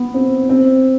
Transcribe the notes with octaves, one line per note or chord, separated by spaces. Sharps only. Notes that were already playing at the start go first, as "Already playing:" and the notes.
Already playing: B3
C4
C4